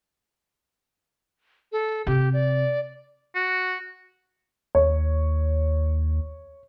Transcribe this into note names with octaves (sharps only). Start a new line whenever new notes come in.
A4
C3 G4
D5
F#4
D#2 C#5